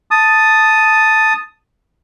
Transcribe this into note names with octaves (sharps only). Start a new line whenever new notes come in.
A5 D#6